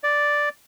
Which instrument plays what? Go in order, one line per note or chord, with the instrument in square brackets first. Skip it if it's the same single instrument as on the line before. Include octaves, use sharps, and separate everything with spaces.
[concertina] D5